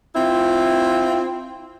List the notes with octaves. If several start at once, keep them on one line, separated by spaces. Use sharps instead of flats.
C4 E4 F4